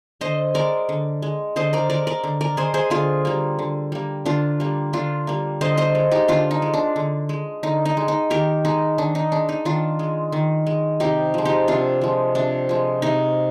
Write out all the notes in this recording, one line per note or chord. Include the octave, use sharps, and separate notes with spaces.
D3 C5 D#5
G#3 A#4 D5
D3
G#3
D3 C5 D#5
A#4 D5
G#3 A#4 D5
A#4 D5
D3
A#4 D5
G#3 G#4 C5
G#4 C5
D3 F4 G#4
G3 A#3
D3
G3 A#3
D3 D4 F4
G3 A#3
D3 D4 F4
G3 A#3
D3 C5 D#5
C5 D#5
G#3
D#4 G4
D3 D4 F4
D#4
G#3
D4
D3
G#3
D3 D#4
D#4
G#3
D#4
D#3 G4 A#4
G#3 D#4
D#3 D4
D#4
G#3 D4
D#4
D#3 D4 F4
G#3
D#3
G#3
C3 D#4 G4
F3 G#3
D#4 G4
C3 D4 F4
F3 G#3
C3 D4
F3 G#3
C3 D#4